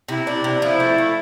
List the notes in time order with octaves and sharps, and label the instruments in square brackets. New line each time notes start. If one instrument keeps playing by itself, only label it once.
[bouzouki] C3 [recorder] E4
[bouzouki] D4
C3
[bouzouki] F3 [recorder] E4
[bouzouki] A3
A3